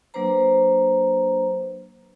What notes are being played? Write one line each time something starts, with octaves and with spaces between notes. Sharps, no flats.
F#3 A#3 D4 B4 C5 A#5